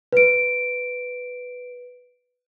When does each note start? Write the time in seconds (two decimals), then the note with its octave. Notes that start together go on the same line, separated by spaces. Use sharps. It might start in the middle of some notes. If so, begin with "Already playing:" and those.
0.13 B4 D7